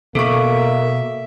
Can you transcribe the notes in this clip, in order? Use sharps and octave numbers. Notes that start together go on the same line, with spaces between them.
B2 A#3 A4 E5 C#6